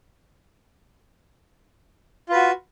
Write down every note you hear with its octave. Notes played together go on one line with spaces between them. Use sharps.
F4 F#4 B4